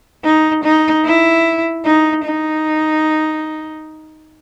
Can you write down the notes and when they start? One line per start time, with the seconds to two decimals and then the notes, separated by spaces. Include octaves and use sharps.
0.24 D#4
0.64 D#4
1.05 E4
1.85 D#4
2.25 D#4